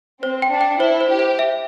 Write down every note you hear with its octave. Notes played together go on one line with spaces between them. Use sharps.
C4 C5
G5
D4
G5
E4 C5
C5
G4
C5
E5